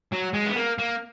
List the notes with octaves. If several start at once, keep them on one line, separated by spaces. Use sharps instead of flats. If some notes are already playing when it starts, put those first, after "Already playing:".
F#3
G#3
B3
A#3
A#3